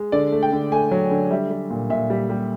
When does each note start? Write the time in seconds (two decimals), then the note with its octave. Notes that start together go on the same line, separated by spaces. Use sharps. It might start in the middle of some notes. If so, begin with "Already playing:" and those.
Already playing: G#3
0.12 D3 D5
0.32 A3
0.42 G5
0.52 D3
0.72 A3 G#5
0.92 F#3
1.11 D3
1.31 G3 E5
1.51 G3
1.70 A#2
1.90 A#2 E5
2.10 G3
2.30 G3